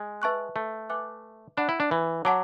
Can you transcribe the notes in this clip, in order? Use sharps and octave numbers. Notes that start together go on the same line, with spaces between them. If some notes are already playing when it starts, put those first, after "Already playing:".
Already playing: G#3
B4 E5 A5 C#6 F#6
A3
B4 E5 G#5 D6 F#6
D4 F#5 B5 F#6
E4
D4
E3
F#3 F#5 A5 D6